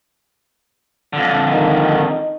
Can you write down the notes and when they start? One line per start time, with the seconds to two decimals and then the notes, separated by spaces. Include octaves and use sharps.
1.13 F2 D3
1.52 D#3 D#4